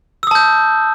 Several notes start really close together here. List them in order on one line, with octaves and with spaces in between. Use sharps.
E6 D#6 A5 G6